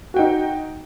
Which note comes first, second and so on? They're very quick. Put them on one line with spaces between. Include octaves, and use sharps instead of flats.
F#4 G5 D#4